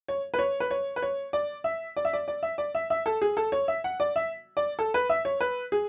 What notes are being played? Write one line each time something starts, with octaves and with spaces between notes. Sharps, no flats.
C#5
B4
C#5
B4
C#5
B4
C#5
D5
E5
D5
E5
D5
D5
E5
D5
E5
E5
A4
G#4
A4
C#5
E5
F#5
D5
E5
D5
A4
B4
E5
C#5
B4
G#4